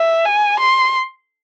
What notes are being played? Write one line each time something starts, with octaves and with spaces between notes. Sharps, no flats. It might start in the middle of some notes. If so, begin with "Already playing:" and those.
Already playing: E5
G#5
C6